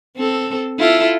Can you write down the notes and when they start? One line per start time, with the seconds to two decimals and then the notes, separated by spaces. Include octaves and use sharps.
0.17 C4 A4
0.79 E4 F4 A4